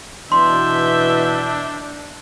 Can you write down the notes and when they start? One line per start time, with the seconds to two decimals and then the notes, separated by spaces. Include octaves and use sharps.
0.32 B2 E3 D4 E5 C6 G6